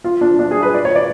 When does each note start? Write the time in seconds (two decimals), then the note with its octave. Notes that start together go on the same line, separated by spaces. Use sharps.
0.04 F4
0.21 D4
0.39 D4
0.51 G#4
0.63 B4
0.74 D5
0.85 C#5
0.96 D5